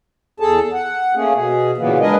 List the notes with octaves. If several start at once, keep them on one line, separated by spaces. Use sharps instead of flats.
E2 G#4 A4 A5
F#5
A3 A#3 C#4 G#4
B2 G#4
A#2 C#3 E3 F#3 A#3 B3
G#3 D4 G#4 A#4 B4 D#5